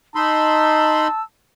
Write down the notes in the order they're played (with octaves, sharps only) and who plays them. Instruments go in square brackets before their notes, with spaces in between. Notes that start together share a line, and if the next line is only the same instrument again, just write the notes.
[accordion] D#4 B5 C6 [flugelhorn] A5 [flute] E6